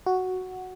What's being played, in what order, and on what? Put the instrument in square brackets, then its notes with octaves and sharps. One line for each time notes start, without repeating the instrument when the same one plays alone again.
[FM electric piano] F#4